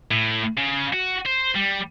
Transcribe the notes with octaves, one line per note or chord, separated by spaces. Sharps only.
A2
C#3
F#4
C5
G3